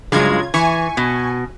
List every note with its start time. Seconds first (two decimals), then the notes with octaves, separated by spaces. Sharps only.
0.12 G2 C#3 F#3 G#3 F4 G#6
0.54 E3 G#5 C#6
0.97 B2